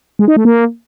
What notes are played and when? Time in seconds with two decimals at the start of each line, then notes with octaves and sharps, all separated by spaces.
0.19 G#3
0.28 D#4
0.36 A3
0.45 A#3